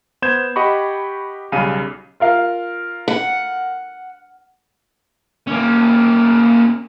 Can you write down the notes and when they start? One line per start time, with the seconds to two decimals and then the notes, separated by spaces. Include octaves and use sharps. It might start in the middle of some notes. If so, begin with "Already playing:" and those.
0.22 B3 C5 G6 G#6 E7
0.56 G4 D#5 F#5 B5 C#6
1.52 B1 C#3 G3 F5 D#7
2.20 F4 A#4 F5
3.08 F#5
5.47 A#3 C#4